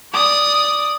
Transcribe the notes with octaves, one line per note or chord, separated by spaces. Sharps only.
D5 D#6